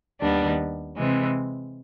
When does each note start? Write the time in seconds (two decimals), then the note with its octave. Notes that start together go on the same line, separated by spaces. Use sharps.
0.21 D#2 D#3 G3 B3 D4
0.98 C3 E3 G#3